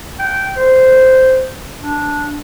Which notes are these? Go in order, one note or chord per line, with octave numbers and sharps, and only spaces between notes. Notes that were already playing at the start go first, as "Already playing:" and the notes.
G5
C5
D4